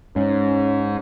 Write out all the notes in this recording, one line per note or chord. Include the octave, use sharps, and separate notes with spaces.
G#2 C#4